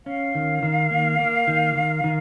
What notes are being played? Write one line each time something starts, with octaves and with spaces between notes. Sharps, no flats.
C#4 F5
D#3
D#3
A#3
A#3
D#3
D#3
D#3